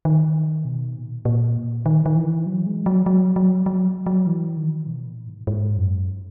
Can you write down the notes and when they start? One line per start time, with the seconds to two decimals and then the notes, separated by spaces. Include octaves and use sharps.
0.05 D#3
0.65 B2
0.95 A#2
1.25 A#2
1.86 D#3
2.06 D#3
2.16 E3
2.46 F#3
2.67 G#3
2.86 F#3
3.06 F#3
3.36 F#3
3.66 F#3
4.06 F#3
4.27 E3
4.57 D#3
4.87 B2
5.07 A#2
5.27 G#2
5.47 G#2
5.77 F#2